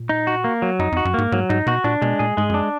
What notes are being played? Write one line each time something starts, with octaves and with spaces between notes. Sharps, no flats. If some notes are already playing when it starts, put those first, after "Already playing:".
Already playing: A#2
D#4
F#4
A#3
F#3
F#2 D#4
F2
F#4
F#2
G#2 A#3
G#2 F#3
G#2 D#4
B2 F#4
A#2 D4
B2 G#3
A#2 G#4
G#2 G#3
F#2 D4